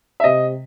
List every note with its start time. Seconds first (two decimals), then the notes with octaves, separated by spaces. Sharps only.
0.20 E5
0.24 C3 D#5